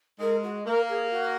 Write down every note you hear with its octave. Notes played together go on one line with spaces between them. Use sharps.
G#3 A#4
F#4
A#3 A#4
G#4
F#4